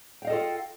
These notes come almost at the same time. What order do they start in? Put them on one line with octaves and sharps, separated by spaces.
G5 F5 D#5 A4 F4